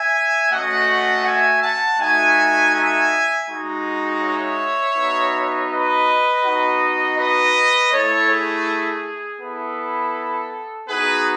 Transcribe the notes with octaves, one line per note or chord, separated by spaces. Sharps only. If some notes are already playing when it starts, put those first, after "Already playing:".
Already playing: E5 G#5
A3 C#4 F#4 D#5 F#5
E5 G#5
F#5 A5
A3 D#4 F#4 E5 G#5
E5 G#5
G#3 D#4 F#4
C#5 E5
B3 D#4 F#4
B4 D#5
B3 D#4 F#4
B4 D#5
A3 E4 A4 C#5
G#4
B3 E4 A4
B3 D#4 F#4 G#4 B4